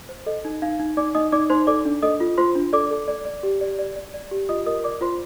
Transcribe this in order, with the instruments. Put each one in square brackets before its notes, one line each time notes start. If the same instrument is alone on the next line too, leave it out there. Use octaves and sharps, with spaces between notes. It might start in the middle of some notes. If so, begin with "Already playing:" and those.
[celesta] C5
A4 D#5
D#4
D#4 F5
D#4
D#4 D5 D6
D#4 D#5 D#6
D#4 D5 D6
D#4 C5 C6
A4 D5 D6
D4
A4 D#5 D#6
F4
F4 C5 C6
D4
A4 D5 D6
A4
D5
D5
G4
D5
D5
D5
D5
G4
F4 D#5 D#6
A#4 D#5 D#6
D5 D6
F4 C5 C6